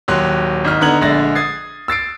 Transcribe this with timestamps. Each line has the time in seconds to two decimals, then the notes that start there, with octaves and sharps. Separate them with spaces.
0.08 D#1 F#3 G4 C6 F#6
0.65 G#1 D#4 F6
0.81 D3 B3 D#4 A#5 G#6 F#7
1.01 A#1 D3 G#3 E5 A6 A#6
1.35 D#6 G#6 A6 C7
1.88 E6 A6 C7 D7